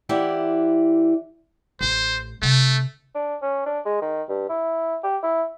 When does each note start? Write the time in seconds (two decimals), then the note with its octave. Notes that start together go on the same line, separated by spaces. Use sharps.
0.09 E3 E4 G4 C5 D5 F#5
1.81 A1 C5
2.42 C3 A3 C4
3.15 D4
3.42 C#4
3.66 D4
3.86 G#3
4.02 D#3
4.29 G2
4.49 E4
5.03 G4
5.23 E4